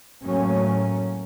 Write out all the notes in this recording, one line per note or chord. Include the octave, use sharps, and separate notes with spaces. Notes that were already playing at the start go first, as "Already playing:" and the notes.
A2 F#3 A3 A#3 C#4